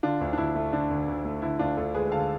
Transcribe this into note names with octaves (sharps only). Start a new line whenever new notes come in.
D3 D4 F4
D2
D4
D2 E4
A3
D3 D4
D2
D2
A3
D3 E4
D2 D4 F4
D2 F4 A4
G#3 G#4 B4
D3 F5 A5